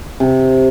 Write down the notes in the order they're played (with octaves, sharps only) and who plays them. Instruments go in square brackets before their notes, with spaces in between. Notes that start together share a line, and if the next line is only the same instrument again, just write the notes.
[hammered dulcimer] C3